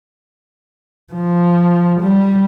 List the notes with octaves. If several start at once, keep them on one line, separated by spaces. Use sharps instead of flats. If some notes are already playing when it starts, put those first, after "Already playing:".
F3
G3